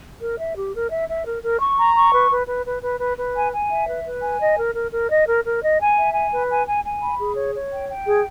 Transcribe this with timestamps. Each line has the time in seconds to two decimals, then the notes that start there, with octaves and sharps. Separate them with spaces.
0.20 A#4
0.37 E5
0.55 G4
0.72 A#4
0.90 E5
1.08 E5
1.25 A#4
1.42 A#4
1.60 C#6
1.77 A#5
1.94 C#6
2.12 B4
2.30 B4
2.47 B4
2.65 B4
2.82 B4
2.99 B4
3.16 B4
3.34 G#5
3.51 G#5
3.69 E5
3.87 B4
4.05 B4
4.22 G#5
4.39 D#5
4.57 A#4
4.74 A#4
4.91 A#4
5.09 D#5
5.26 A#4
5.44 A#4
5.61 D#5
5.79 G#5
5.96 E5
6.13 G#5
6.31 B4
6.48 G#5
6.66 G#5
6.83 G#5
7.01 B5
7.18 G#4
7.36 C#5
7.54 C#5
7.71 G5
7.89 G5
8.06 G#4